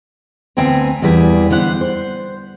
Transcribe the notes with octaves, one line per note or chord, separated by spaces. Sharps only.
D2 B3 C4 G5 G#5 A#5
E2 G3 B4 G#5
D3 B3 C5 F#5
C5